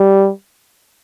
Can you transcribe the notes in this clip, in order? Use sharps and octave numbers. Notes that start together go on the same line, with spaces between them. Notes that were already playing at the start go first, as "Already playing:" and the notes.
Already playing: G3